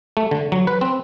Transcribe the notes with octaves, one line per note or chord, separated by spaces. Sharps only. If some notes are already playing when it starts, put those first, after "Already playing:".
A3
D3
F#3
B4
C4